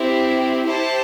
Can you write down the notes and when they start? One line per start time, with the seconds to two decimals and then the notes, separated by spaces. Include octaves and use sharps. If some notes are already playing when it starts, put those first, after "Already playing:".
Already playing: C4 E4 G4
0.66 E4 G4 C5 A5